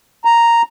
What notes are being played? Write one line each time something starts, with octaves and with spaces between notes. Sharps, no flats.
A#5